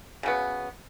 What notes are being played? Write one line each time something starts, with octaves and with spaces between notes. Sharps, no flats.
C#3 F#3 B3